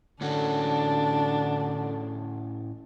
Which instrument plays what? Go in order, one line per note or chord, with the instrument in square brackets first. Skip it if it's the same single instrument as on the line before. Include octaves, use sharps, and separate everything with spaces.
[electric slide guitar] A2 C#4 F#4 [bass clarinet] D3 [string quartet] D4